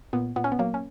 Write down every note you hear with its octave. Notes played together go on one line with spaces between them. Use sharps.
A#2 B3
A#2 B3
C#4
B3
F#3 A#3
C#4